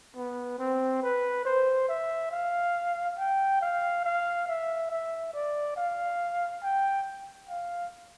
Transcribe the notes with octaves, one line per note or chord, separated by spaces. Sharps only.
B3
C4
B4
C5
E5
F5
G5
F5
F5
E5
E5
D5
F5
G5
F5